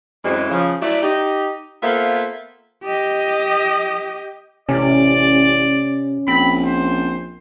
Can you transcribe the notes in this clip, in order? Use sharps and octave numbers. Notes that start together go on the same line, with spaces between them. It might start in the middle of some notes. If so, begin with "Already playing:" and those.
F#2 E3 G#3 A3 C4
C#3 F3
F#3 A3 E4 D5
D#4 G4
A#3 B3 F4 A4 C5 E5
G4 D#5
A1 C3 C#4 D5
A#1 C4 B5
C5